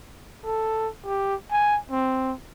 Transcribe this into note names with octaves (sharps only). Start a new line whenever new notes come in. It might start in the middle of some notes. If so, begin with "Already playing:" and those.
A4
G4
G#5
C4